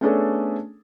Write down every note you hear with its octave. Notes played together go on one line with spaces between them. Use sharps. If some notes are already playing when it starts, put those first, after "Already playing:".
A3 B3 C#4 D4 G#4 A4